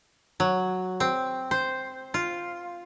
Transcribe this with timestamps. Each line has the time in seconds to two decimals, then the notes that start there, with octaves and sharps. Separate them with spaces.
0.40 F#3
1.00 C4
1.51 C5
2.14 F4